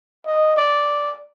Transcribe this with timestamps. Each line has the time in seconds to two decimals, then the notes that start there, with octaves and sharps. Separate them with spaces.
0.26 D#5
0.57 D5